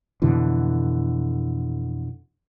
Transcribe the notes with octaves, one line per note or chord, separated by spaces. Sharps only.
F2 B2 D3 E3